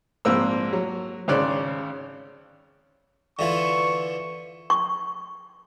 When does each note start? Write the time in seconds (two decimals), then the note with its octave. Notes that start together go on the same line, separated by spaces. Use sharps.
0.25 A#1 G#2 A#3 C4 E6
0.73 F#3
1.28 G#1 C#3 C#4 C5 D5 F#6
3.39 D3 E3 F4 C#6
4.70 C#6